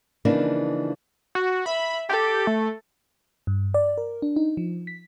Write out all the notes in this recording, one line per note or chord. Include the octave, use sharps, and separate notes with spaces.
C#3 E3 F3 A#3 D4 D#4
F#4
E5 B5
G4 A4
A3
G2
D5
A#4
D4
D#4
F3
B6